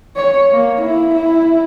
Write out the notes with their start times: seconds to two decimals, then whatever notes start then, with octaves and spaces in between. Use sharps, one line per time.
0.17 C#5
0.51 A#3
0.81 E4
1.15 E4